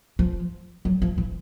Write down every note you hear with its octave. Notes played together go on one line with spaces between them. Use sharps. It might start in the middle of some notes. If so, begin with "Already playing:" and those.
F3
F#3
F3
E3